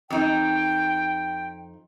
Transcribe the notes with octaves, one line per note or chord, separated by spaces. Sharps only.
F2 D#4 G5